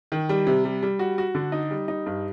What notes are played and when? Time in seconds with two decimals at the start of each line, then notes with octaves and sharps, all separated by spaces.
0.12 D#3
0.29 G3
0.47 C3
0.65 G3
0.83 G3
0.99 F#4
1.18 F#4
1.35 D3
1.52 D#4
1.71 G3
1.88 D#4
2.06 G2